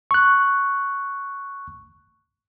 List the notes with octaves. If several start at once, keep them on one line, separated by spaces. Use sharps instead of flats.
C#6 F#6